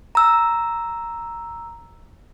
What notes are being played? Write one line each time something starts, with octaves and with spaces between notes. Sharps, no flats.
A#5 E6